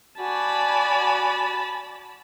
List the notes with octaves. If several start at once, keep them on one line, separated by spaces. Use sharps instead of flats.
F#4 D5 G#5 A5 B5